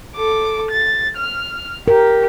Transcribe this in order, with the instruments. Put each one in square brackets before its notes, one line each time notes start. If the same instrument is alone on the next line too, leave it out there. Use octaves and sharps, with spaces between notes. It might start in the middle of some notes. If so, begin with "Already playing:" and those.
[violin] A4 D6
A6
F6
[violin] G4 [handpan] A#4